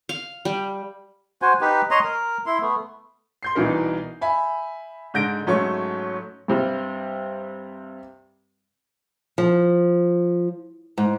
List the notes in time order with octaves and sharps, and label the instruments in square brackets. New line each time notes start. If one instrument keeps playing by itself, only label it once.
[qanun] F5
G3
[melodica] F#4 C5 G#5
D#4 G4 B4
C#5 D#5 A#5 C6
A#4
E4 C6
A3 B3
[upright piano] C6 G6 C7
C2 B2 E3 D#4 A#4
E5 G#5 B5
G#2 D3 G6 A#6 D7
G#2 F#3 A3 C#4 A4 C#6
[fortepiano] G2 C3 G3
[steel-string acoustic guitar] F3
G#2